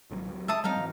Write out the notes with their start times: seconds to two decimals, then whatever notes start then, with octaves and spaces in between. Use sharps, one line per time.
0.11 G#1 B2 F#3
0.28 C#2 F#3
0.48 G#3 E5 A5 D#6
0.64 F#3 G3 C4 D#4 F5 G5
0.76 G#2 E3